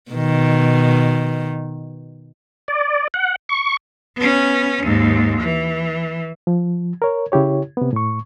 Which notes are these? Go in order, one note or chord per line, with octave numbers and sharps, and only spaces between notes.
B2 D#3
D5
F#5
C#6
B3 C#4
D#2 G#2
E3
F3
A#4 C#5
C#3 E4 G4 C#5
C3 B3
A2 C#6